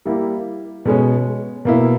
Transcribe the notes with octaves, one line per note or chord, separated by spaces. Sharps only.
G3 A#3 E4
B2 G#3 C#4
B2 A#3 E4